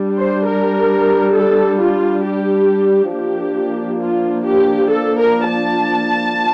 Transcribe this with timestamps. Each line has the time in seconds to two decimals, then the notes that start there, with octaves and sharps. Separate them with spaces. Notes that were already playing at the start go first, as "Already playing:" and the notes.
Already playing: G3 D4
0.18 C5
0.47 A#4
1.35 A4
1.79 F4
2.24 G4
3.12 F3 A#3 D4 G4
4.01 F4
4.45 G4
4.89 A4
5.19 A#4
5.49 A5